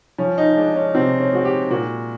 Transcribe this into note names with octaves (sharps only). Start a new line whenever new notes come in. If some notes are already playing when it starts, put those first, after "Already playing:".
F3 C#4
D#4
G#3 D4
C#4
C3 C4
C#4
G#3 F#4
G4
A#2 F#4